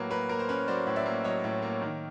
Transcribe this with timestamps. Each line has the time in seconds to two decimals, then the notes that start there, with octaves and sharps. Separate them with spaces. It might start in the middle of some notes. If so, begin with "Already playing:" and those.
Already playing: A2 F#3 A#3 B4
0.10 A#3 B4
0.29 A#3 A#4
0.39 C5
0.49 C#4 B4
0.68 F#3 C5 D5
0.87 A2
0.96 D5 E5
1.06 A#3
1.24 F#3 C#5 D#5
1.44 A2
1.62 A#3
1.82 D#3